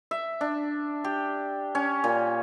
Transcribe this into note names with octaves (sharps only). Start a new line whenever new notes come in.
E5
D4
G4
C#4
A#2